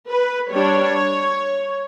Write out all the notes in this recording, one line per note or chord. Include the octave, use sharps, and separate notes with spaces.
B4
G3 D4 C#5